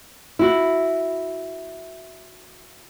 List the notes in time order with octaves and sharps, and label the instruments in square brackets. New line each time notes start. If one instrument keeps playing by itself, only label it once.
[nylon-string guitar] E4 F#4